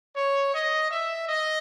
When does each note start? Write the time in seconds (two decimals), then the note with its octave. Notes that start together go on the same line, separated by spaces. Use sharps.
0.16 C#5
0.53 D#5
0.91 E5
1.28 D#5